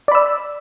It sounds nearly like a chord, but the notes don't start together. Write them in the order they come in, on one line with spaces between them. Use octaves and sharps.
D5 B5 E6